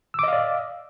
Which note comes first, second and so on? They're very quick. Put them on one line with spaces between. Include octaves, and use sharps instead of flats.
E6 D6 D#5 F5 D5